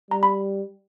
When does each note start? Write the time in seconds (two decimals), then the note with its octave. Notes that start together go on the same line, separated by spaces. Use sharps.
0.11 G3 A#5
0.23 B5